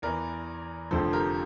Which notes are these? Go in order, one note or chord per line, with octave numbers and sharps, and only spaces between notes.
E2 E3 A#4 D5
F1 F2 D3 F3 A4 C5
G4 A#4